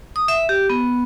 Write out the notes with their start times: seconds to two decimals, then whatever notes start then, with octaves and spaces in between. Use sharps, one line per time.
0.16 D#6
0.28 E5
0.49 G4
0.70 B3